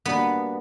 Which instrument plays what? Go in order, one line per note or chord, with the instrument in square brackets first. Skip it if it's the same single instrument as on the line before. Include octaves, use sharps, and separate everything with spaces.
[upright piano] G3 A#3 D4 F#4 [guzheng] B3